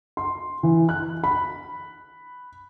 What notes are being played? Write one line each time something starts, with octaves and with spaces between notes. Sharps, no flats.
C6
E3
F#6
B5